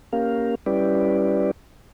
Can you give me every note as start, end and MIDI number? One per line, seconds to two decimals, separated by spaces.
0.13 0.55 58
0.13 0.55 61
0.13 0.55 67
0.13 0.55 70
0.13 0.55 77
0.66 1.51 55
0.66 1.51 61
0.66 1.51 64
0.66 1.51 67
0.66 1.51 71
0.66 1.51 74